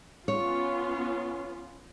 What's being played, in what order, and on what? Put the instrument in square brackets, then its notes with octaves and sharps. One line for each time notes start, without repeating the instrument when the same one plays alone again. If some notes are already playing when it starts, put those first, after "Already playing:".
[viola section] B3 C#4 F4 [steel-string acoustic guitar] C#5